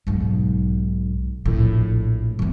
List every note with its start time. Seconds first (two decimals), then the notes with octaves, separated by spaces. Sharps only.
0.07 B1 G#2
1.45 A#1 A2
2.39 F3 B3